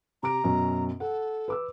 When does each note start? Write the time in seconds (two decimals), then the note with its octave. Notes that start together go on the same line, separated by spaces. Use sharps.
0.23 C3 A#5 D6 D7
0.44 F#2 B2 C#4
1.00 A4 F#5
1.48 B4 D6 E6